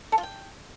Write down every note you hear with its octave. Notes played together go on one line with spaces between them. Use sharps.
A4
F4
G5